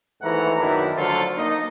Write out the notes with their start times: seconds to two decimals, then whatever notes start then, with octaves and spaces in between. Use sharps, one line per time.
0.22 D#2 G#2 E3 A3 F#5 A#5
0.59 F#2 B2 D#3 B3 D4 E4
0.97 D3 F3 F#3 A3 F4 A4
1.36 A#3 D#4 D#5